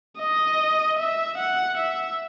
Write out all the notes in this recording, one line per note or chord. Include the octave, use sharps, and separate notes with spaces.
D#5
E5
F#5
E5